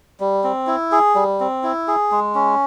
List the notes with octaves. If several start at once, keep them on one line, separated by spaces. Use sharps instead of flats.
G3
C4
E4
G#4
G3
C4
E4
G#4
G#3
C#4